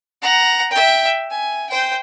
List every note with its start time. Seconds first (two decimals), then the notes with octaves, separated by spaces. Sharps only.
0.22 F#5 A#5
0.71 E5 G5
1.31 G#5
1.70 C5 G5